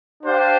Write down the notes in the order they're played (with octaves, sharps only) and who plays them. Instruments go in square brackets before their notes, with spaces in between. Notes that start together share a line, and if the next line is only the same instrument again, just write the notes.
[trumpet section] D4 G4 C5 F5